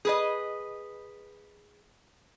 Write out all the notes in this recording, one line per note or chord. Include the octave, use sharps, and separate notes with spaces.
G#4 B4 D#5